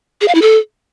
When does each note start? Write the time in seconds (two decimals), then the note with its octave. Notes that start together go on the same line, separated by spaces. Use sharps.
0.21 G#4
0.28 F5
0.35 E4
0.42 A4